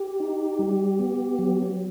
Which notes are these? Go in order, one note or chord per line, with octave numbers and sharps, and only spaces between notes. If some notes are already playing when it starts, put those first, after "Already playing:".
Already playing: G4
D#4
G3
B3
F#3